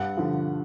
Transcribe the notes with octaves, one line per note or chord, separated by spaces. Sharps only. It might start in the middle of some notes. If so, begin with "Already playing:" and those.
Already playing: G2 F#5
D3 F3